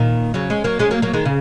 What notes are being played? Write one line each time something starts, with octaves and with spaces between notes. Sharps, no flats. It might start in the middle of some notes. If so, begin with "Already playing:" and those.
Already playing: A#2 D#3
C#3 F#3
G#3 C#4
F#3 A#3
G#3 C#4
F#3 A#3
F#3 A#3
D#3 G#3
C#3